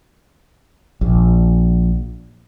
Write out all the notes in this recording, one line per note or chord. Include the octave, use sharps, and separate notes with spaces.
A#1